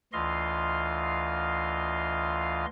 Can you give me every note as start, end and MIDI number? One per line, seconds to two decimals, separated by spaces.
0.13 2.66 38
0.13 2.66 52
0.13 2.66 65
0.13 2.66 75
0.13 2.66 77
0.13 2.66 84